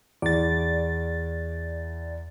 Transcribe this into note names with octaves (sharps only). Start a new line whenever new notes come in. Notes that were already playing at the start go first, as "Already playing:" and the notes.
E2 D5 A6